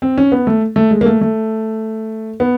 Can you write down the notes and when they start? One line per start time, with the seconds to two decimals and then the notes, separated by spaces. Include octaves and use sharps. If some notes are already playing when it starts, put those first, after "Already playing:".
0.02 C4
0.18 C#4
0.32 B3
0.47 A3
0.76 A3
0.91 G#3
1.01 A#3
1.06 A3
1.21 A3
2.40 B3